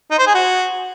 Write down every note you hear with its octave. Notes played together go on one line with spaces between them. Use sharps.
D#4
C5
G#4
F#4